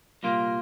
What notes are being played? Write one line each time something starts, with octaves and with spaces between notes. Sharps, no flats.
C2 A#2 G3 A#3 F4